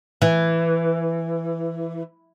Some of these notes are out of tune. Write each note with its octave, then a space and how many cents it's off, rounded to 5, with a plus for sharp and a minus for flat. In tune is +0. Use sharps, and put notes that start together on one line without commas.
E3 +10